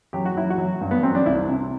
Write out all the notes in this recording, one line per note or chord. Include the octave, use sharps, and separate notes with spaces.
F#3 G4
F#4
F#3 E4
F#4
F#3
G2
B3
F#3 C4
D4
C2 E4
C3